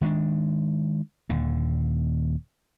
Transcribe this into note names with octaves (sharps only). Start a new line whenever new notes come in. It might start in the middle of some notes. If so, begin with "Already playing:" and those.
D#3 G#3 C#4 D4
D#1 D#2 D3